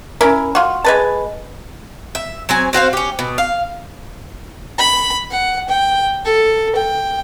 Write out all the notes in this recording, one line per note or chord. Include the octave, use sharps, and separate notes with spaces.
C#4 E4 A#4
F4 F#4
G#3 B4 A5
E5
F#3 C4 G#5
C4 F#4 C5 F5
C#4 G4
B2
F5
B5
F#5
G5
A4
G5